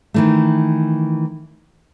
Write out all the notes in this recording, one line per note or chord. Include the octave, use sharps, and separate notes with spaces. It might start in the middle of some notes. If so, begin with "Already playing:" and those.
D#3 E3 A3